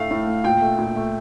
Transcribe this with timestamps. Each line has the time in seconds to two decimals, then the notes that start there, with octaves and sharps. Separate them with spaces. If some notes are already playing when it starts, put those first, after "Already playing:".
Already playing: A2 A3 F5
0.11 A2
0.27 A3
0.44 A#2 G5
0.62 A3
0.79 A#2
0.96 A3